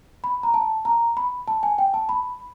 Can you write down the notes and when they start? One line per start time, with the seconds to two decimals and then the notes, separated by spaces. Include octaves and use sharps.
0.24 B5
0.43 A#5
0.54 A5
0.85 A#5
1.17 B5
1.48 A5
1.63 G#5
1.78 G5
1.94 A5
2.09 B5